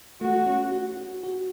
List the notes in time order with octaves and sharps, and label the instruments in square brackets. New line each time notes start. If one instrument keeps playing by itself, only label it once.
[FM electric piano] A3 [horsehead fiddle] F#4
[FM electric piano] C#4
F#4
F#4
F#4